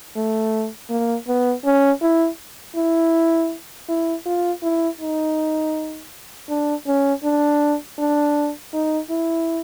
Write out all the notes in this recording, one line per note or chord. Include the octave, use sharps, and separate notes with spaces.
A3
A#3
B3
C#4
E4
E4
E4
F4
E4
D#4
D4
C#4
D4
D4
D#4
E4